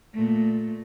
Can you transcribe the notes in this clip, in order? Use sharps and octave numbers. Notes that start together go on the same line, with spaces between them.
A#2 A3